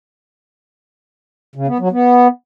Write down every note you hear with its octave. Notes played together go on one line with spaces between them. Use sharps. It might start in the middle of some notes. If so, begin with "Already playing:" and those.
C#3
B3
F#3
B3